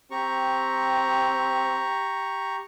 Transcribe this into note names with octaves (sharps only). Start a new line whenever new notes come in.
C4 G4 A#5 C#6